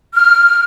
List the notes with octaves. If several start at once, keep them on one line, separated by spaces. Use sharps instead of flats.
F6